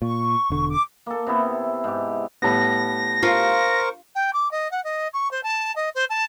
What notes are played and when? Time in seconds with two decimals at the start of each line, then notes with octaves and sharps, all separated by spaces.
0.02 A#2 C#6
0.50 E1 D3
0.70 D6
1.06 A#3 A4
1.27 C3 B3 E4
1.84 G#2 G4
2.42 A2 G3 B3 A#6
3.23 F4 A#4 C5 C#6
4.15 G5
4.33 D6
4.51 D#5
4.71 F#5
4.84 D#5
5.13 C#6
5.31 C5
5.43 A5
5.75 D#5
5.95 C5
6.09 A5